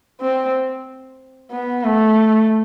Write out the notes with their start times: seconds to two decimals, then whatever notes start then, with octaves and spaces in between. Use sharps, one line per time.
0.21 C4
1.51 B3
1.84 A3